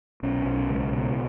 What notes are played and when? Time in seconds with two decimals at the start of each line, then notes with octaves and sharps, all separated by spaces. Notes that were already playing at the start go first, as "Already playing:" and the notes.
0.23 B1 C#4
0.45 B1
0.69 C#2
0.92 B2